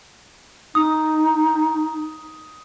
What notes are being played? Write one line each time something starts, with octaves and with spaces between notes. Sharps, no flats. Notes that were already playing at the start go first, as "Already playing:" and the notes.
D#4 D#6